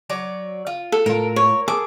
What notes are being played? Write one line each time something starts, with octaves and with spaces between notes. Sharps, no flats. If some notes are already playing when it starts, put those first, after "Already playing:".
F#3 C#5 D5
F4
A4
A2 F4 A#4
C#5
G#4 A4 D6